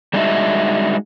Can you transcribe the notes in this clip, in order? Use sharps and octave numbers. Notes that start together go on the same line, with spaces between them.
G3 G#3 D4 D#4 F#4 E5